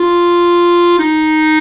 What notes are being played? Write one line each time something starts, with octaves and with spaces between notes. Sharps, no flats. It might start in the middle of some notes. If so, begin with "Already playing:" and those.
Already playing: F4
D#4